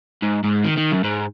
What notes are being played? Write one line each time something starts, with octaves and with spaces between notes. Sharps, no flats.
G#2
G#2
D#3
D#3
F#2
G#2